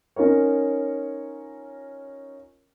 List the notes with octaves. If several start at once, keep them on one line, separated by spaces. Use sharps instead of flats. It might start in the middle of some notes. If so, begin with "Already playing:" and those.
C#4 D#4 F4 A#4 C#5